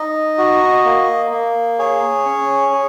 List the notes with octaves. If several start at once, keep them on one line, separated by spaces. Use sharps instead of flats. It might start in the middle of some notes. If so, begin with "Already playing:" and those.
Already playing: D#4 D#5
F#4
A#3
A#3
G#4 C#5
C#4
G#4